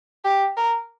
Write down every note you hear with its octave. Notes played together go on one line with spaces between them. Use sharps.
G4
A#4